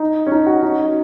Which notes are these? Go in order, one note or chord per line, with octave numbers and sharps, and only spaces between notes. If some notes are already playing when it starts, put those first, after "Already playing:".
Already playing: D#4
C#4
D#4
F#4
D#4